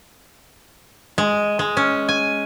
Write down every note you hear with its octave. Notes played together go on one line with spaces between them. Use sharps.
G#3
G#3
C#4
G#5